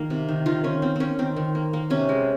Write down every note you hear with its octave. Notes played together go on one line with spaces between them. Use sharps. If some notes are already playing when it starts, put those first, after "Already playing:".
Already playing: D#3 A#3
C3
D#3
D#3 F4
D#3 C#4
A#3 C4
A#3 C4 C#4
D#3 C4
D#3
A#3
A#3
C3 C#4
G#3